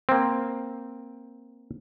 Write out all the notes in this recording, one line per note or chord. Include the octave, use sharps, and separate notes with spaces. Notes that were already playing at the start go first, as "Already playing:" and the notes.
A#3 C4